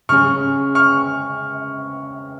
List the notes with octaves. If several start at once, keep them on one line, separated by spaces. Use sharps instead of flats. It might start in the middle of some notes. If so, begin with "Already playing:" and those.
C#3 G#3 C#4 G#4 C#6 F6
C#6 F6